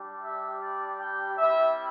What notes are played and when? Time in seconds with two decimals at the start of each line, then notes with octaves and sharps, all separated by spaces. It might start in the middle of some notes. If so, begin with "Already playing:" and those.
Already playing: G3 D4 G4
0.22 E5
0.60 D5
1.00 G5
1.37 G3 C4 E4 E5